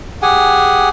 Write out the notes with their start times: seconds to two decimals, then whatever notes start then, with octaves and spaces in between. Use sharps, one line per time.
0.22 G4 G#4 F#5 G#5